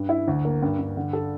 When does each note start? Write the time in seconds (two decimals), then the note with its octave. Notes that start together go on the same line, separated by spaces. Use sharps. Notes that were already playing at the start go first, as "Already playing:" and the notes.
Already playing: G2
0.09 E4
0.27 D2
0.45 A#3
0.62 G2
0.79 G2
0.97 D3
1.13 A4